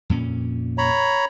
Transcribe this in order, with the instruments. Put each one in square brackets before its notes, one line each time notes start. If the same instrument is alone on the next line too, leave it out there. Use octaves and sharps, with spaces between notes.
[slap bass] F2 A#2 C#4
[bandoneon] C#5 A#5 B5